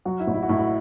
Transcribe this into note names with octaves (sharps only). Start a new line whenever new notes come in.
F#3 F#4
E4
A1
E4
F#4
A2 E4
F#4